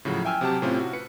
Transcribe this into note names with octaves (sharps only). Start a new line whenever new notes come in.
A2 C#3 F3 F#3
E5 G5 G#5 E6 F6
C3 F#3 G4 A5
A2 C3 A3 C4 C#4 F4
F#4
B4 C#7